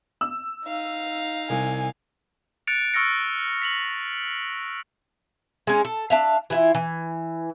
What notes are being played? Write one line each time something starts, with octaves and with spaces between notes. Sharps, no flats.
E6
D#4 F5
C2 G#5
F#6 A6 C#7 D7 F7
C#6 E6 F6 A6 A#6 C#7
B6 F7 F#7
G#3 C#4
A4
D4 E5 F5
E3 E4 F4
E3